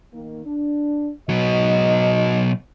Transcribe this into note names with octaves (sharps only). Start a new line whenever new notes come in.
D#3 A#3
D4
G#2 B2 F#3 D#5